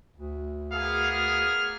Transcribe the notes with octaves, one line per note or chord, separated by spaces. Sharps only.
D2
A#3 B3 G#4 F5
F6